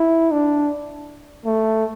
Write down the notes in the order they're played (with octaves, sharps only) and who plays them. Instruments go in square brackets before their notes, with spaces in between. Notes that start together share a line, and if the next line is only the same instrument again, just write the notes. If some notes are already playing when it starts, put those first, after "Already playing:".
Already playing: [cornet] E4
D4
A3